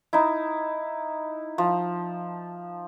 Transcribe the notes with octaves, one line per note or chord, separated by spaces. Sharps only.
D#4 E4
F3